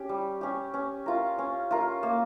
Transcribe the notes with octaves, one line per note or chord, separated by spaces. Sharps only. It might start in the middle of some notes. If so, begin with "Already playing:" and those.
Already playing: C#4 G4
G3
C#4 G4
C#4
F4 A#4
C#4
F4 A#4
A#3